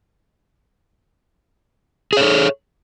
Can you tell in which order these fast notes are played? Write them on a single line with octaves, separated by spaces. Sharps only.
G#4 C#5 A4